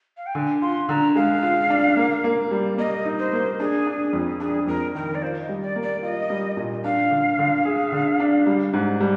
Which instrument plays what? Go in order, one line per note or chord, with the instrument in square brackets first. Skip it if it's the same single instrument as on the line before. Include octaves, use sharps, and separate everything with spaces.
[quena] F5
G5
[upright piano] D3 [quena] G#5
[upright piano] F4 [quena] C6
[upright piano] D3 [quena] A#5
[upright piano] G#3 [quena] F5
[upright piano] F4
D4
A#3
A#3
G3
[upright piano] A#3 [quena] D#5
[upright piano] D#4
[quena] C5
[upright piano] A#3
[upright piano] D4 [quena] G#4
[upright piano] D4
F2
[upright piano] D4 [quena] G#4
[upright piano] F2 [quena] A#4
[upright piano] D#3 [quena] A#4
[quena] D5
[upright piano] F4 [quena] C5
[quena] D#5
[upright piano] G3
[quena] D5
[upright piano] A#3
[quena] D5
[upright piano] F4 [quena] D#5
[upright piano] G3
A#2
[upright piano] D4 [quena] F5
[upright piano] D3
D3
G#4
D3
D4
G3
G#2
G3